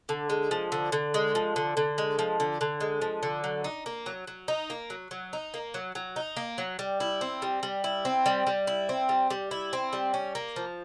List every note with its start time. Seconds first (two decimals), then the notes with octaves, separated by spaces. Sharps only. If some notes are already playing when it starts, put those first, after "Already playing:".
0.09 D3
0.30 G#3
0.51 F3
0.72 D3
0.92 D3
1.14 G#3
1.35 F3
1.56 D3
1.77 D3
1.98 G#3
2.19 F3
2.40 D3
2.61 D3
2.81 G#3
3.02 F3
3.23 D3
3.44 F#3
3.64 D#4
3.86 A#3
4.06 F#3
4.27 F#3
4.48 D#4
4.70 A#3
4.90 F#3
5.11 F#3
5.33 D#4
5.54 A#3
5.74 F#3
5.95 F#3
6.16 D#4
6.37 A#3
6.58 F#3
6.79 G3
7.00 E4
7.21 C4
7.42 G3
7.63 G3
7.84 E4
8.05 C4
8.26 G3
8.47 G3
8.67 E4
8.89 C4
9.09 G3
9.30 G3
9.51 E4
9.73 C4
9.93 G3
10.14 C#4
10.35 A#3
10.56 F3